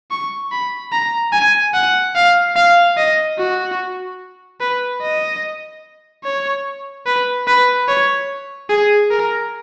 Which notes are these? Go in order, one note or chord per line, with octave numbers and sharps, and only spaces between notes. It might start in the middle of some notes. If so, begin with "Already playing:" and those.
C#6
B5
A#5
G#5
F#5
F5
F5
D#5
F#4
B4
D#5
C#5
B4
B4
C#5
G#4
A#4